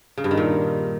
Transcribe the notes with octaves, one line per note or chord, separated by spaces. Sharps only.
C#3
G2
D#3
A#2